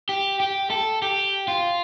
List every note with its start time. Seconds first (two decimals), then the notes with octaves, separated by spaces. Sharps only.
0.09 G4
0.40 G4
0.70 A4
1.02 G4
1.48 F4